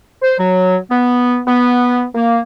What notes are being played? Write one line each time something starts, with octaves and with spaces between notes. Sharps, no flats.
C5
F#3
B3
B3
A#3